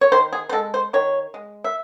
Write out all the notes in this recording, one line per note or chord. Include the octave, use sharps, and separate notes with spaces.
C#5
D#3 C5
G#4
C5
G#3 A4
C5
D#3 C#5
G#3
E5